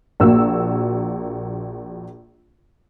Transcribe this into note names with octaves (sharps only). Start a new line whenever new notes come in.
A#1 A#3 F#4 E6